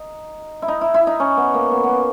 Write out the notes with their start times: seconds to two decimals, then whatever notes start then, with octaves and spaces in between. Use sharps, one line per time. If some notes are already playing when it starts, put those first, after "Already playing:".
Already playing: D#4
0.62 E4
0.68 D#4
0.81 E4
0.94 E4
1.07 D#4
1.20 C#4
1.37 B3
1.54 A#3
1.71 B3
1.84 A#3 B3